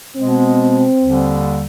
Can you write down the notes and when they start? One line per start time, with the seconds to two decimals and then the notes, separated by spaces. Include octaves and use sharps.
0.17 B2 G#3 B3 C4
1.01 D#2 D3 G3